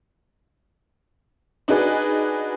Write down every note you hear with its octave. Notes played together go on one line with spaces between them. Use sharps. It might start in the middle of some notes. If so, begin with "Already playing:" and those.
D4 D#4 F#4 G#4 B4